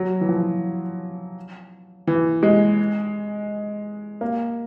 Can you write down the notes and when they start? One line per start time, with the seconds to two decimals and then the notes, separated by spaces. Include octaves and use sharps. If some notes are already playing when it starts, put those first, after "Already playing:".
Already playing: F#3
0.21 E3
0.29 F3
2.07 E3
2.43 G#3
4.21 A#3